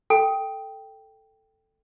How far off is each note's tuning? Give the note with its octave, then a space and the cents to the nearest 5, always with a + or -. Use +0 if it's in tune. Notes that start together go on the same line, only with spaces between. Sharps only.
A4 +0 G5 +0